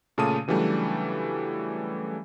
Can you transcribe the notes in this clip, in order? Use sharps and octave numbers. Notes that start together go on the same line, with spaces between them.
A#2 C#3 A3 A5 D#6 D#7
C#3 E3 F#3 G3 A3 D4